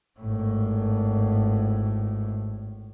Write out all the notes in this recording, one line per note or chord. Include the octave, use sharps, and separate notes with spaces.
G#1 A2